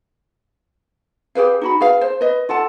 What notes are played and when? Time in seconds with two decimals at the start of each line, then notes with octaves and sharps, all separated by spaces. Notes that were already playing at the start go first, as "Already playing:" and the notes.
1.35 G4 G#4 B4 F5
1.61 D#4 F#4 B5
1.80 G#4 B4 F5
2.01 C5
2.21 B4 D#5
2.49 F4 A4 F#5 A5